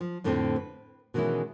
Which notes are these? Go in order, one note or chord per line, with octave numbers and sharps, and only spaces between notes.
F3
F2 A2 D3 F3 A3 C4
B4
B2 D#3 E3 G#3 C#4 E4